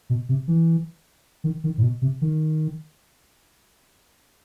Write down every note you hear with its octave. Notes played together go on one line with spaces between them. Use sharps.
B2
C3
E3
D#3
D#3
A2
B2
C3
D#3